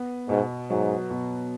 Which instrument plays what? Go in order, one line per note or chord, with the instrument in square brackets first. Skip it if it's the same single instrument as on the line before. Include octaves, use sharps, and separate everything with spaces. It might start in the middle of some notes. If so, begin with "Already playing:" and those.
Already playing: [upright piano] B3
[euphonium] G#2 [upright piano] B2
[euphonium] G#2 [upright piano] F#3
[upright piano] B2